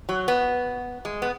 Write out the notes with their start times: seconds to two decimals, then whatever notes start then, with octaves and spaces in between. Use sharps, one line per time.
0.09 F#3
0.28 B3
1.05 G#3
1.22 B3